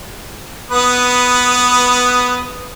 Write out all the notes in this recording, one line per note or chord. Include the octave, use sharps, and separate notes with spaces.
B3 B4 D#6